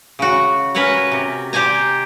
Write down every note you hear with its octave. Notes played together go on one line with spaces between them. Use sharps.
C#3 F#4
C#4 A#4 B4 C#5 F#5
C3
G4 C5 D5 G#5 A#5